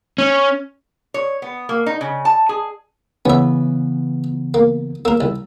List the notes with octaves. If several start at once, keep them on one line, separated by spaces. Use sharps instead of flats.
C#4
C#5
B3
A#3
D#4
C#3
A5
G#4
C#3 E3 B3 C#4 E5
A#3
A#3 A#4 E6
C2